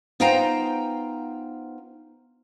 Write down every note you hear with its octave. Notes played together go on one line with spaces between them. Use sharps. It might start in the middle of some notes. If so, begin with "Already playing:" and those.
B3 D#4 F4 C5 G5 A#5